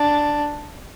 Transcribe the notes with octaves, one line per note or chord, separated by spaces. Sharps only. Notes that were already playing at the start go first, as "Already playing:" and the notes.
Already playing: D4